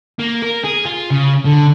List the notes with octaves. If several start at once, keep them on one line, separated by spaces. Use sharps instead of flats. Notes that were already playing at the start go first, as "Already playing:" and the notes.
A#3
A#4
G#4
F4
C#3
D3